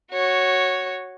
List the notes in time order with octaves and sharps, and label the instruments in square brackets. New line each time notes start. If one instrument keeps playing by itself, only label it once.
[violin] F#4 C#5